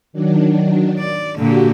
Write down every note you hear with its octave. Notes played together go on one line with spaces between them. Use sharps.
D#3 F#3 D4
D5
A#2 D3 F#4 G4